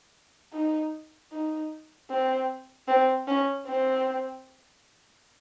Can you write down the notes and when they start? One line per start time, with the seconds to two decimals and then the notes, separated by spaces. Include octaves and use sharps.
0.53 D#4
1.32 D#4
2.10 C4
2.88 C4
3.28 C#4
3.66 C4